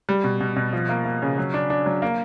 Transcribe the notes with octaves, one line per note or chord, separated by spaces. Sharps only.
G3
B2
B2
B2
F3
A#3
A#3
C#3
F#3
D4
D4
F#3
A#3